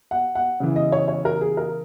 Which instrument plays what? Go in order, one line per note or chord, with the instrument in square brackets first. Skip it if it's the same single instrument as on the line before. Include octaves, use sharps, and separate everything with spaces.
[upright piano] F#5
F#5
C#3 E3
D#5
C#5
C#5
A#4
G#4
A#4